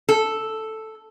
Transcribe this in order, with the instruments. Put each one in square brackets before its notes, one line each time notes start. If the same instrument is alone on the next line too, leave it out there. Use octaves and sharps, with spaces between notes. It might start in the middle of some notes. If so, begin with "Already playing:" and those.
[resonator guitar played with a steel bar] A4